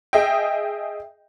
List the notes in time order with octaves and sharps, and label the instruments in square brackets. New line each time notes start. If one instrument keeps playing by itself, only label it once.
[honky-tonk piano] G#4 D#5 E5 G5